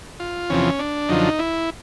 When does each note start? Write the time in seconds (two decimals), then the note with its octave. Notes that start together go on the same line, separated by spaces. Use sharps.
0.20 F4
0.50 E2 C3 F3 C#4
0.79 D4
1.09 F#2 D3 F3 D#4
1.39 E4